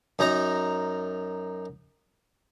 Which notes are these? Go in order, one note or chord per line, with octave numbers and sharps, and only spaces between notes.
F#2 D#4 A#5